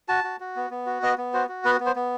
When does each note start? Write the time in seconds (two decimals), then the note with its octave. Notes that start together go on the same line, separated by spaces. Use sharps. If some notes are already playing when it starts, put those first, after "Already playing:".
0.08 F#4 A5
0.24 F#4
0.40 F#4
0.56 B3
0.70 B3
0.86 F#4
1.03 B3 D#5
1.18 B3
1.34 F#4 C5
1.49 F#4
1.65 B3 B4
1.80 B3
1.86 C5
1.96 B3